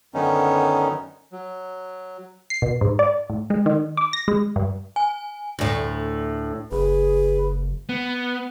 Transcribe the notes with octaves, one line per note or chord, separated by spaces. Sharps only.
F#2 D3 D#3 B3 C#4 D#4
F#3
C7
B2
G#2
D5
A2
G#3
D#3
D6
A#6
G#3
G2
G#5
D2 A2
F#1 G#4 B4
B3